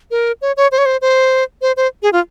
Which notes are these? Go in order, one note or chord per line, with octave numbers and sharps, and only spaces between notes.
A#4
C#5
C#5
C5
C#5
C5
C5
C5
C5
G#4
F4